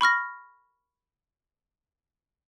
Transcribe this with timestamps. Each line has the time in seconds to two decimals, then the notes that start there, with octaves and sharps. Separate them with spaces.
0.01 B5 C#6 F6 A#6